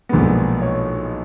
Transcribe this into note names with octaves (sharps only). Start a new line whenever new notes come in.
B1 A#2 F3 G#3 B3
C#5